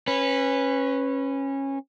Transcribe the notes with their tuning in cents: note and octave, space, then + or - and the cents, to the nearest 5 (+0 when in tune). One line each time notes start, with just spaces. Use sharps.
C#4 -20 B4 +0